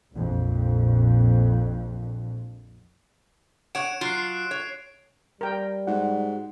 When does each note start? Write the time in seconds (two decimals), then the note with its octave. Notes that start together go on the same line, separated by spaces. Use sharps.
0.12 A#1 F2
3.75 C#5 F#5 D7 E7
4.01 F#3 F4 F#6 C7 D7
4.51 C#5
5.41 G3 A#4 G5
5.87 G#2 F#4 F#5